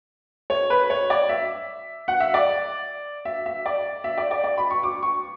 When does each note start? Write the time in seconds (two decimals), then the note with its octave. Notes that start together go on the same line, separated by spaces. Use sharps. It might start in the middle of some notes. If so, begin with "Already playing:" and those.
0.50 C#5
0.70 B4
0.90 C#5
1.10 D5
1.29 E5
2.08 F#5
2.20 E5
2.34 D5
3.25 E5
3.46 E5
3.66 D5
4.04 E5
4.18 D5
4.31 D5
4.44 D5
4.58 B5
4.70 C#6
4.83 D6
5.03 C#6